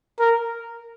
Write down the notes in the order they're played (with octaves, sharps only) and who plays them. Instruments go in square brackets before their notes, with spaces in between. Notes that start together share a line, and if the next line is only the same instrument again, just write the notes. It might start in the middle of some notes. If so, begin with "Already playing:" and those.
[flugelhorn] A#4